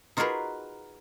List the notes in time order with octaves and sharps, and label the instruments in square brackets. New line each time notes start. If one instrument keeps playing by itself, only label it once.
[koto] D#4 F4 F#4 G#4 A#4 B4